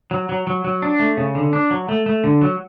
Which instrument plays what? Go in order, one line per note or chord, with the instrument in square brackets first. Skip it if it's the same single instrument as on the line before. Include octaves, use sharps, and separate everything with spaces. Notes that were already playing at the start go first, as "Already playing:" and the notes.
[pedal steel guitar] F#3
F#3
F#3
F#3
D4
A3
C#3
D3
D4
F#3
A3
A3
D3
F#3